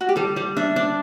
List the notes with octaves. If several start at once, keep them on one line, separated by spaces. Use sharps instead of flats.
F#4
G4
G3 A4
G3 D5
D4 E5
D4